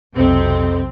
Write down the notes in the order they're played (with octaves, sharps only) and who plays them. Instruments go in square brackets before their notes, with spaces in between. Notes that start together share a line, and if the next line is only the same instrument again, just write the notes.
[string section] B1 C3 C4 [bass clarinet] F2